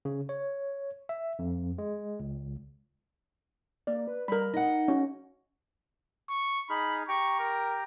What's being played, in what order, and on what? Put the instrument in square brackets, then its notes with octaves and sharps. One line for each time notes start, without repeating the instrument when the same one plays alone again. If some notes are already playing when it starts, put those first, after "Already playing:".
[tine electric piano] C#3
C#5
E5
F2
G#3
C#2
[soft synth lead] A#3 [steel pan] D5
[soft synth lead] B4
[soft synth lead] G3 [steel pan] A#4 B5
[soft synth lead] D#4 [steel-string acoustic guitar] D#5 F#5
[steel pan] C#4 F#4
[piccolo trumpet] C#6
[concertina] D#4 G#4 F6 [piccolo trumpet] B5
[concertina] G4 G5 A#5 [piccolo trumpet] C#6
[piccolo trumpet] A#4